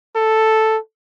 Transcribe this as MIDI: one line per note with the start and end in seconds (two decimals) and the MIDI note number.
0.16 0.77 69